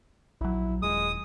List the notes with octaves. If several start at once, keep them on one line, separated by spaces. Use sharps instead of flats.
A#1 F#3 E4
D#1 G#3 D#6